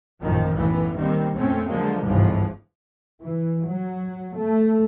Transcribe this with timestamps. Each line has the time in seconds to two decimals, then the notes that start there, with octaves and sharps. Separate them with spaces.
0.21 A1 F#2 A#2 D#3 F3
0.54 B1 F#2 A2 E3 B3
0.94 D#3 G3 A#3 C4
1.36 F2 A#2 A3 C4 C#4
1.67 D3 F3 F#3 G#3 A#3
2.04 G1 C2 G#2 C3 E3 F3
3.22 E3
3.67 F#3
4.35 A3